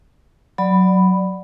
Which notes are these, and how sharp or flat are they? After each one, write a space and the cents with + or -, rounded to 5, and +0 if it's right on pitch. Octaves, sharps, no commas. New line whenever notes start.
F#3 +0 D5 +0 B5 +0